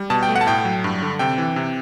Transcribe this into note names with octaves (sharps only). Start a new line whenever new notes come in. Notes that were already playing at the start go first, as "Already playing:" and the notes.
Already playing: G3
B2 A5
G5
A3
F#5
A5
A2 G5
F#3
G2
D3
C3 G5
E3
C3